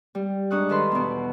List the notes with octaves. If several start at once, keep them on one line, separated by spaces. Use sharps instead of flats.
G3
G#2 D4 C#6 D#6 F#6
D#3 F4 A4 B4 D#5 C6
E2 B2